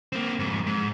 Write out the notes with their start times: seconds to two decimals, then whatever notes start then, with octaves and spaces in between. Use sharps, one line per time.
0.13 A#3 C4
0.39 F2 G#2
0.66 G#2